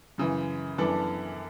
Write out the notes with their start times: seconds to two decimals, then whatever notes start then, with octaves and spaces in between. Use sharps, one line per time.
0.18 F#2 C#3 E3
0.78 F#2 E3 B3 D4 A4